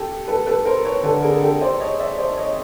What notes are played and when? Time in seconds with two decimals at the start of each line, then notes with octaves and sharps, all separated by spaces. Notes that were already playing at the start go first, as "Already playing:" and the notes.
Already playing: G4 A4
0.28 A4 B4
0.46 A4 B4
0.65 A#4 C5
0.85 B4 C#5
1.04 D3 A4 B4
1.22 G#4 A#4
1.41 G4 A4
1.61 C5 D5
1.80 C#5 D#5
1.99 D5 E5
2.18 C5 D5
2.37 C#5 D#5